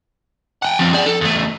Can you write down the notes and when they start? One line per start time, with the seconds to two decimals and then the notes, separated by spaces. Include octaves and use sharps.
0.62 F#5 G5
0.79 F3 C4
0.93 G#4 D5
1.06 A4
1.21 E2 A3